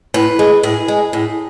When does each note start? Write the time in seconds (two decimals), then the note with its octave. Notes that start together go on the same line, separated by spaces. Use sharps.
0.14 A2 B4
0.39 G#3
0.63 A2 G#4
0.88 G#3
1.13 A2